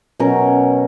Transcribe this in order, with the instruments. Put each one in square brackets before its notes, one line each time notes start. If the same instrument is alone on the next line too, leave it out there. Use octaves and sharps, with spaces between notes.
[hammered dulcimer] B2 F#3 C#4 A#4